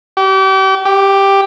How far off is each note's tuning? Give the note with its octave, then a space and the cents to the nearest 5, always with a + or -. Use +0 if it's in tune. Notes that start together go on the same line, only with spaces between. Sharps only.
G4 -35
G4 +5